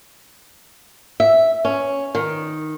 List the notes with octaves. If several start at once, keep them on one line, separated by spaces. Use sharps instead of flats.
E5
C#4
D#3